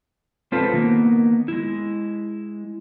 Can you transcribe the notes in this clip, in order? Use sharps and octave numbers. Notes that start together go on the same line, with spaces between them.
G#3 C4 F4 A4 B4 C5
D#3 A#3 B3
G#3 E4